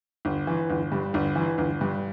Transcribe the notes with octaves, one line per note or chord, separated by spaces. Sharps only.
G1
E3
G1
G2
G1
E3
G1
G2